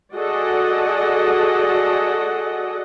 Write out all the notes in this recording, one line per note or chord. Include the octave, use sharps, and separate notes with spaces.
F#4 G#4 A4 D5 D#5 F#5